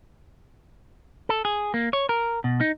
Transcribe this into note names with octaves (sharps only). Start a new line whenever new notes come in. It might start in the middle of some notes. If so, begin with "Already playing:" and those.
A4
G#4
A#3
C#5
A#4
B2
D#4